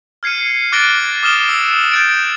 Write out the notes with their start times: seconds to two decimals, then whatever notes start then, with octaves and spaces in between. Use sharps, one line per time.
0.23 F6 G#6 C7 C#7 D#7
0.72 D6 F#6 A6 A#6 D7 G7
1.23 D6 D#6 F6 E7 G7
1.49 E6
1.91 G6 A6 D7